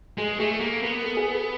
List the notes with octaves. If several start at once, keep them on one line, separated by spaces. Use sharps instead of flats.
G#3 G#4
A3 G#4
A#3 A4
B3 A#4
A4
G#4
A4